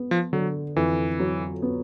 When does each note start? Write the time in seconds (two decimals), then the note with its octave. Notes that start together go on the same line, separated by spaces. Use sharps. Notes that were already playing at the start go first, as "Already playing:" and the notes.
Already playing: B3
0.11 F3
0.33 D3 F#3
0.76 F2 E3
1.20 F#3
1.62 B3